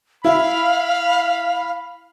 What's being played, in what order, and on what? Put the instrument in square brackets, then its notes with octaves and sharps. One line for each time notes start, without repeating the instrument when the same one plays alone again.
[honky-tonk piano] E4 [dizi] F5 [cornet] B5